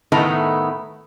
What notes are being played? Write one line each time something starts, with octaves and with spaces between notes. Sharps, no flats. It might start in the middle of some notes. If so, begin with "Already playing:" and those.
A2 D#3 A3 B3 E4 A#5